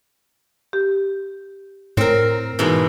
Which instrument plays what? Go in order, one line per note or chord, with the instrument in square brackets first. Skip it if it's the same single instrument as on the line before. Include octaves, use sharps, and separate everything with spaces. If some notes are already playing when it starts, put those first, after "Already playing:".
[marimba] G4
[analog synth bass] A2 [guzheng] C4 A#4 [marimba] C#5
[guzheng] G#2 B2 E3